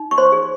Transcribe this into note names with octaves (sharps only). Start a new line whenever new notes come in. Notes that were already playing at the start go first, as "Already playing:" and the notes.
Already playing: D#4
C#6
C5 C6
G#4